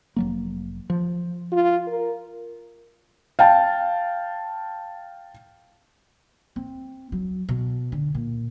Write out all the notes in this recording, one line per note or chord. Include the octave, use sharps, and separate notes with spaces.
F1 F#3 A#3
F3
F4
A#4
F5 G5 A5
C4
F#3
B2
D3
A#2